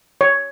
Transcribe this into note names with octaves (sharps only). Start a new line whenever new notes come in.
C#5